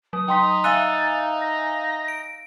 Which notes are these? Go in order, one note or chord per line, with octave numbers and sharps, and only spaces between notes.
F#3 D#6
D#4 G5 C6 B6
E5 F5 G#5 E6 F#6 A6 D#7
A#6
D7